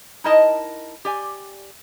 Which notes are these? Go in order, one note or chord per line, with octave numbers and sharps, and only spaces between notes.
D#4 E4 A#4 D#5 A5
G4 D5 G#5